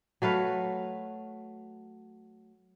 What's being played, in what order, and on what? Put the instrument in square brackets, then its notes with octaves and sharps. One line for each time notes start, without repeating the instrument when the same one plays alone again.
[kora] F#3 A3 B4 F5